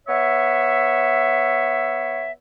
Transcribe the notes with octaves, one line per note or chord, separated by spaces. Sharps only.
B3 C#5 E5